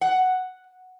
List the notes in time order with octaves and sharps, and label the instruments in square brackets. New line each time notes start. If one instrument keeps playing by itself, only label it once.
[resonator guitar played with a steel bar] F#5